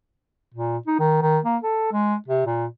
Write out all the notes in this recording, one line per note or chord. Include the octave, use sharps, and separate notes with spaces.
A#2
D#4
D#3
D#3
A#3
A4
G#3
C3
A#2